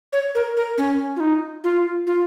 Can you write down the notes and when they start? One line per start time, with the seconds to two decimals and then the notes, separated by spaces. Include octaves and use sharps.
0.13 C#5
0.35 A#4
0.57 A#4
0.78 C#4
1.16 F4
1.20 D#4
1.64 F4
2.07 F4